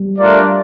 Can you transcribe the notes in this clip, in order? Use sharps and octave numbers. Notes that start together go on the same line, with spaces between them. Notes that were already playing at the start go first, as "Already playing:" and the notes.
Already playing: G3
A3 D4 F4 A#4 D5